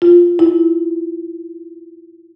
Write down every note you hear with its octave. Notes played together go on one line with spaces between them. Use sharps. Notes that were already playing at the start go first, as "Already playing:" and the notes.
F4
E4